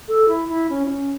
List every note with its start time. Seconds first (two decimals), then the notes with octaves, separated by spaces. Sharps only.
0.08 A4
0.28 E4
0.48 E4
0.70 C#4
0.85 E4
0.90 C#4